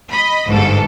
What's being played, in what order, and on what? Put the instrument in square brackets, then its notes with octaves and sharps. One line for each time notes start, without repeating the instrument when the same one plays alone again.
[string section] D#5 B5
G1 G#2 A4